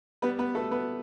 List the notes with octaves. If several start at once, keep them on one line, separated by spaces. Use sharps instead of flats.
G3 B3 B4
B3 B4
A3 B3 A4
B3 B4